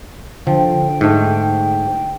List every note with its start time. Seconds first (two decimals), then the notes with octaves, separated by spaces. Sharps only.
0.47 D3 F3 G5
1.01 G#2 A3